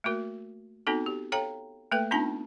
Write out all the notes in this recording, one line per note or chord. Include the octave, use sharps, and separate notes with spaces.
A3 A#3 F#4 A#4
B3 C4 D#4 F#4 A4
G4
A4 C#5 F5 G5 A#5
A3 A#3 A4 B4 G5
B3 C4 D4 D#4 F4 A5